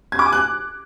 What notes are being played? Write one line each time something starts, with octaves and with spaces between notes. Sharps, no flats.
G#6
D6
G#5
F#6